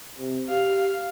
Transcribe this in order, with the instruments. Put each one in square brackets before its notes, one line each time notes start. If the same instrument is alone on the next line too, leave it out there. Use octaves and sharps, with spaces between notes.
[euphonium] C3
[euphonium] G4 [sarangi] F5